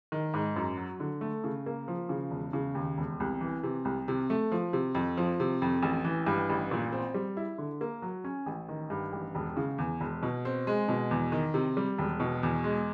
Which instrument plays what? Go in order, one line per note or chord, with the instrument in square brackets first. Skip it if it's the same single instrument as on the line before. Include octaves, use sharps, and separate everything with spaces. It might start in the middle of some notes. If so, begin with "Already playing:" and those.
[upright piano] D#3
G#2
F#2
F#3
D3
A3
C#3
A#3
F3
C#3
E1
C#3
D#2
E1
C2
E3
C3
C2
C3
A3
F3
C3
F2
F3
C3
F2
A1
E3
G2
A1
A#2
C4
G3
E4
D3
A#3
F#3
C#4
A1
D#3
G2
A1
E1
C#3
E2
E1
B2
C4
G#3
B2
E2
D#3
C3
G3
E1
B2
E2
G#3